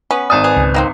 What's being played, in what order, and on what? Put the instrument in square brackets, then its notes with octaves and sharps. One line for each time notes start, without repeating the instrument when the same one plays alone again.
[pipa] B3 C#4 B4
[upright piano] G#1 D#6 [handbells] D5 G#5 A5
[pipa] G#4 [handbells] B4
[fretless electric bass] C#2
[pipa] D#3 A#3 C4